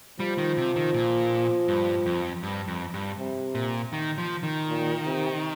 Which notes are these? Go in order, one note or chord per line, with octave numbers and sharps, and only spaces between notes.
F3 G3
D#3
C3
D#3
A#2
G2
F2
G2
F2
G2
C3
A#2
D#3
F3
D#3
A#2
C3